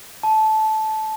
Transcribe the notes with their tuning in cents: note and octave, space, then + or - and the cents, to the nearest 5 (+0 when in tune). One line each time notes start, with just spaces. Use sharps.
A5 -15